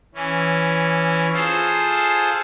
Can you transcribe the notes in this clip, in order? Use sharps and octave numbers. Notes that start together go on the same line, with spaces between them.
E3 C#4
F4 G#4 A4 C5